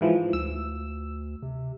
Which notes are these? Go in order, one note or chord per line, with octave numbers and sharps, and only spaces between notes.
G#2 E3 F3
D2 E6
C3